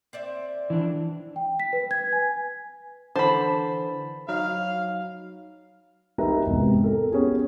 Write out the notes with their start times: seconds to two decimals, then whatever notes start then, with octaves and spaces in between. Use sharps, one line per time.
0.13 C4 D5 E5
0.70 E3 D4
1.36 G5
1.60 B6
1.73 B4
1.91 G#6
2.13 G#5
3.16 D3 E3 C5 A5 B5
4.29 F#3 D#4 F5 F6
6.18 D#4 G4 A#4 B4 E5 A#5
6.46 E1 G#2 C3
6.84 A4 A#4
7.12 B3 C#4 G4 G#4